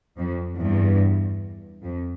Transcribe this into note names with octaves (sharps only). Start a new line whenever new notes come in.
F2
E2 G2
F2